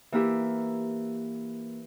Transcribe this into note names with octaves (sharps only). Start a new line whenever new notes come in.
E3 A#3 E4 G4